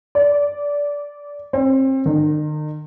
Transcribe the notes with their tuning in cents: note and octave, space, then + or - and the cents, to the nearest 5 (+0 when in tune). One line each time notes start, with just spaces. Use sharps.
D5 -15
C4 +30
D#3 -45